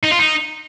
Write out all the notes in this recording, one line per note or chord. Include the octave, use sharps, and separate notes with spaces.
D#4
F4
D#4